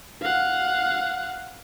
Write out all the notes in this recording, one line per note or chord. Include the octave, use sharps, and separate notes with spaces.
F5 F#5